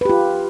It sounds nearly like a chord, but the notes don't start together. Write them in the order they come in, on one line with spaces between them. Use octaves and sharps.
B4 G4 F4